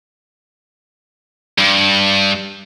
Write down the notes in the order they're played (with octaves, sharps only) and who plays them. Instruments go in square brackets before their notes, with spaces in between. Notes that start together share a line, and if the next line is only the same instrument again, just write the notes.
[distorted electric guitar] G2